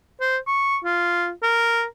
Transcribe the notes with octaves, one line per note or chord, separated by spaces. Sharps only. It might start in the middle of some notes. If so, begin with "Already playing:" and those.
C5
C#6
F4
A#4